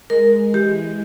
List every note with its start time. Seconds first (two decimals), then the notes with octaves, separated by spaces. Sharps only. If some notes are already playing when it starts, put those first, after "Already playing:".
0.10 G#3 A#4
0.32 G#3
0.53 E3 G4
0.75 G#3